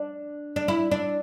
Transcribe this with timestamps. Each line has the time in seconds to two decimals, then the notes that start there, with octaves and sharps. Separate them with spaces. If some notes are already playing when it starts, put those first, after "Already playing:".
Already playing: D4
0.56 D4
0.68 E4
0.91 D4